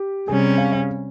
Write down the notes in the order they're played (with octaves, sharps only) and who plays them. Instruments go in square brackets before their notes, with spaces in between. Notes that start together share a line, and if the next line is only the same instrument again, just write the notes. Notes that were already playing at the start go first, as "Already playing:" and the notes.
Already playing: [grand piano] G4
[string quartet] C3 G3 C#4 [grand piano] G#4
[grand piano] F5
F5